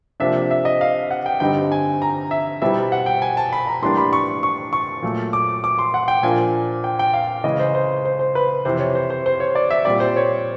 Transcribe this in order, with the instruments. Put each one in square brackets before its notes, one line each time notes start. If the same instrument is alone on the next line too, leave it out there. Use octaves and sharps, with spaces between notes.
[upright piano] C3 F3 A#3 D4 E5
E5
D#5
F5
F#5
G5
G2 D3 G3 C4 D#4 G5
G#5
A#5
E5
B2 G3 C4 E4 E5
F#5
G5
G#5
A5
B5
A#5
A2 E3 G3 A#3 D4 C6
B5
C#6
C#6
C#6
A#2 F#3 A3
D6
D6
C6
F#5
G5
A#2 F3 A#3 D4 G#5
G5
G5
F5
C#3 E3 G#3 D#5
C5
C5
C5
C5
B4
F2 C3 E3 C5
C#5
C5
C5
C5
C#5
D5
E5
A#2 G3 C4 D5
C5
C#5